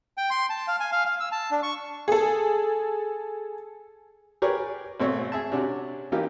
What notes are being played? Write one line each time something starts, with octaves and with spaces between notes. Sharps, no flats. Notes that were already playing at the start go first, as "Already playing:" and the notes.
G5
C6
A5
F5
G#5
F5
F5
E6
A5
D4
C#6
G#4 A4
G4 G#4 A#4 B4 C#5 D5
G#1 B2 A3 C4 C#5 E6
G#4 E5 A5
C3 C#4 D4 F#4
E3 A#3 D#4 F4 G4